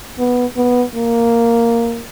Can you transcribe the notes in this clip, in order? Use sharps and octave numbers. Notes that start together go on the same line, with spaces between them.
B3
B3
A#3